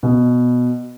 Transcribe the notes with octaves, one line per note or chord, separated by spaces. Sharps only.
B2